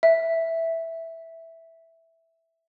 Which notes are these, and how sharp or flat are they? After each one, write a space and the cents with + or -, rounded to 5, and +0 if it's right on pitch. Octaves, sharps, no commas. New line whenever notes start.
E5 -5